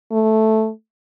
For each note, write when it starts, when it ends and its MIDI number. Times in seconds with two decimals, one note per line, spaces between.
0.12 0.70 57